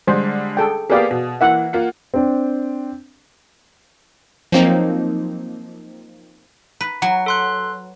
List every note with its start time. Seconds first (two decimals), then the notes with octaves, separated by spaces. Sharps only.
0.07 D3 G3 G#3 C5
0.57 G#4 A4 G5
0.90 A#3 B3 G4 G#4 D5 F5
1.11 B2
1.41 E3 A#3 E5 F#5
1.73 A#3 F4 F#5
2.14 C4 D4
4.52 F3 F#3 A#3 C4 D#4
6.81 B4
7.02 F#3 F#5
7.26 A4 C6 F#6